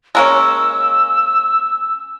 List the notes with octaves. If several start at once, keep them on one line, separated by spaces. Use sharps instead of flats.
G#3 A#3 C#4 E6